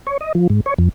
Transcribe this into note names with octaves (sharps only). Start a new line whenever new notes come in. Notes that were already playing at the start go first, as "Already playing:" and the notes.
C#5
D#5
F3
G#2
C#5
F2